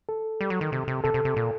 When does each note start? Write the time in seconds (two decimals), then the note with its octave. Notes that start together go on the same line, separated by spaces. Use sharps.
0.09 A4
0.41 G3
0.50 F#3
0.61 D#3
0.72 C3
0.88 C3
1.04 C3 A4
1.14 C3
1.25 C3
1.36 A#2